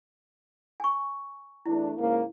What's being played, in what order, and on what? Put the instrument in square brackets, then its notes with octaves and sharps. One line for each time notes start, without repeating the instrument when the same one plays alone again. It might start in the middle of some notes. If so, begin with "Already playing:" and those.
[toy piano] G#5 C#6
[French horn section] E2 A3 D4 [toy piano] E4
[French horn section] G#2 C#3 A#3